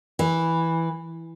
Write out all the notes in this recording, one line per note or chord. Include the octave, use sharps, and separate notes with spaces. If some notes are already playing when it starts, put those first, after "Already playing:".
E3